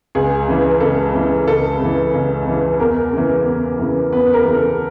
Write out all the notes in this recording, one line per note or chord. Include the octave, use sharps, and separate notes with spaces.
C#2 G#4
C#3 E3
C#2 A4
C#3 E3
C#2 A4
C#3 E3
C#2
C#3 E3
E2 A#4
C#3 E3
E2
C#3 E3
E2 B4
B4
A#4
C#3 E3
A4